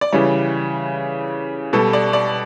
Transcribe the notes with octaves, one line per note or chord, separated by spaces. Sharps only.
D5
C#3 E3 G3 C#5
B2 G3 A4
D5
D5